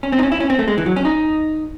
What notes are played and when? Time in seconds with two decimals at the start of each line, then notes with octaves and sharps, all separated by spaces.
0.03 C#4
0.12 C4
0.19 D#4
0.23 C#4
0.32 E4
0.40 C#4
0.50 C4
0.59 A3
0.68 G#3
0.78 E3
0.86 F#3
0.96 C#4
1.05 D#4